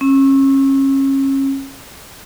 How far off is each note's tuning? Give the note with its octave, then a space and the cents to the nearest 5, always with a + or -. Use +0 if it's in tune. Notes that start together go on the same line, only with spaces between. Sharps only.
C#4 -30 E6 -5